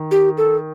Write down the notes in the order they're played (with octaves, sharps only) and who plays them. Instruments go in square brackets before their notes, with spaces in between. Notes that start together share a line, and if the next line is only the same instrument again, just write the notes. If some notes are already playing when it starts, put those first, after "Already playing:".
Already playing: [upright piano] D#3
[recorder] G4
A4